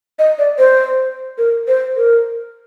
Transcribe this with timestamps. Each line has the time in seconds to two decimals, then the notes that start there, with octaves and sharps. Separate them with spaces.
0.19 D#5
0.38 D5
0.58 C5
1.38 A#4
1.68 C5
1.97 A#4